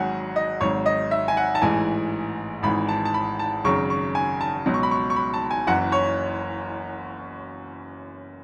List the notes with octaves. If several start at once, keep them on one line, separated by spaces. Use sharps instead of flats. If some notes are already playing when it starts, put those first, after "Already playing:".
Already playing: G#1 G#2 F#3 F#5 G#5
D#5
G#1 G#2 F#3 C#5
D#5
E5
G#5
F#5
A5
A1 G#2 E3 G#5
G#1 G#2 E3 B5
A5
A5
B5
A5
G#1 F#2 C#3 F#3 C#6
C#6
G#5
A5
C#2 B2 F#3
C#6
B5
C#6
C#6
B5
A5
G#5
F#1 F#2 E3 F#5
C#5